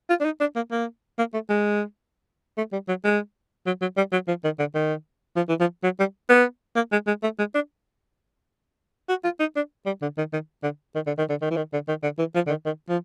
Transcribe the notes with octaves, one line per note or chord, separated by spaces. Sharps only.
F4
D4
D#4
D4
A#3
A#3
A#3
A3
G#3
A3
G3
F#3
G#3
F#3
F#3
G3
F#3
F3
D#3
D3
D#3
F3
E3
F3
F#3
G3
B3
A#3
G#3
G#3
A3
G#3
D4
F#4
F4
D#4
D4
G3
D3
D#3
D#3
D3
D#3
D3
D#3
D3
D#3
E3
D#3
D3
D#3
D3
E3
F3
D3
D#3
D#3
F3